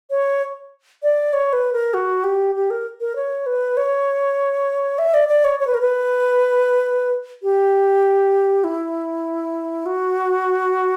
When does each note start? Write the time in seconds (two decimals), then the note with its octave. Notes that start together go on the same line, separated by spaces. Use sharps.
0.10 C#5
1.03 D5
1.33 C#5
1.53 B4
1.73 A#4
1.94 F#4
2.24 G4
2.55 G4
2.70 A#4
3.01 A#4
3.16 C#5
3.46 B4
3.77 C#5
4.99 E5
5.14 D5
5.29 D5
5.44 C#5
5.59 C#5
5.67 B4
5.74 A#4
5.81 B4
7.43 G4
8.64 E4
9.86 F#4